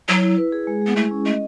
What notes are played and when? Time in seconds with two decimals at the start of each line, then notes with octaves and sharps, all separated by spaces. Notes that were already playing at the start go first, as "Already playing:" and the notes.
0.08 F#3 E4
0.23 E4
0.37 B4
0.52 G#4
0.67 G#3
0.82 G#3 B3
0.96 A3 E4
1.11 C#4
1.26 A3 D#5